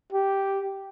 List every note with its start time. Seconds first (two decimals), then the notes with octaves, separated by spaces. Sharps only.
0.13 G4